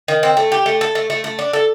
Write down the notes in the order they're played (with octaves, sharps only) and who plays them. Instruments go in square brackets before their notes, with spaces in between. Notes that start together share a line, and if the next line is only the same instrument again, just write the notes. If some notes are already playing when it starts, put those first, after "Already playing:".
[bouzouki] D#3
C4
A3
G4
A3
A4
A3
A3
A3
D4
A4